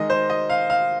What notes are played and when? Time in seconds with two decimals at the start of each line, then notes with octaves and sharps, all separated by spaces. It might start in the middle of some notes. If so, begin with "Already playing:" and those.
Already playing: D#3 G#3 D#5
0.10 C5
0.30 D#5
0.50 F5
0.70 F5